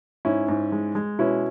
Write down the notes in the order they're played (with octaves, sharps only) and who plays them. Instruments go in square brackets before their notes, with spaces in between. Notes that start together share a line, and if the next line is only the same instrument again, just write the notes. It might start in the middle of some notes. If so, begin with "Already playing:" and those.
[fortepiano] G#2 C#4 E4
G#2
G#3
G#3
B2 C#4 E4